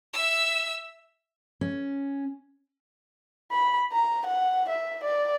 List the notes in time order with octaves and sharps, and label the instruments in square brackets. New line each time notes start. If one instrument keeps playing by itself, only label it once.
[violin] E5 E6
[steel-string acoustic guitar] C#4
[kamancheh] B5
A#5
F#5
E5
D5